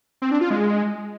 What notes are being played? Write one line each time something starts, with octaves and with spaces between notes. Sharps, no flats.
C4
D4
F4
G#3